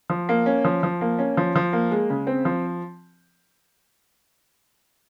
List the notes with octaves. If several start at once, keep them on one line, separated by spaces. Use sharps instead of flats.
F3
A#3
C#4
F3
F3
A#3
C#4
F3
F3
A#3
G#3
C#3
C4
F3